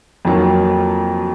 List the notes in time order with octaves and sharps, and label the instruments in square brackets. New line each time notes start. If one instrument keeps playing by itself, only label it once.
[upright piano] F2 D#3 F#3 A#3